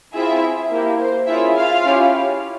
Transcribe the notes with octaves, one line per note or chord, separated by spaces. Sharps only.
C4 E4 F4 G#4 E5
A#3 E4 G4
C5
C#4 E4 F4 G#4 E5
F4 F5
C#4 E4 G4